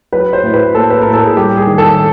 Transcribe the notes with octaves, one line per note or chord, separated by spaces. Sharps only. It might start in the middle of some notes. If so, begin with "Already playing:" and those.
F#3 B4
C5
A2
B4
A#3 A4
B4
A2 A#4
A4
G#4
G3 G4
G#4
D#3
A4